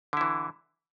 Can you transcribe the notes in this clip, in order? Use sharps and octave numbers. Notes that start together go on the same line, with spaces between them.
D3 E3 E4